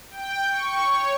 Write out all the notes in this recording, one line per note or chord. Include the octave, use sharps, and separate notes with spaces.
G5
C#6
C#5